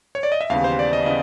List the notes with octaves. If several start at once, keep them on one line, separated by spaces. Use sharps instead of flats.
C#5
D5
D#5
E5
D#2 C#3 E3 G3 B3 F5
C5
D5
D#5
C#3 E3 B3 D#5